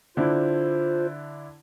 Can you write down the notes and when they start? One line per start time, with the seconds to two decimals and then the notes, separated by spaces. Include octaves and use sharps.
0.17 D3 D4 E4 F4 C5